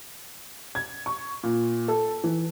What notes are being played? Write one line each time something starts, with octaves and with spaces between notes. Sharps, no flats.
G#6
C#6
A#2
A4
E3